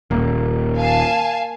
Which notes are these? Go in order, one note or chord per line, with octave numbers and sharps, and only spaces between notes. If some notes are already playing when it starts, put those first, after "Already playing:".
D#1 A#3
F5 G#5 A5